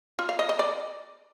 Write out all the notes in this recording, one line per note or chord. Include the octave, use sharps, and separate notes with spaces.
F4
F5
D#5
D#5
D5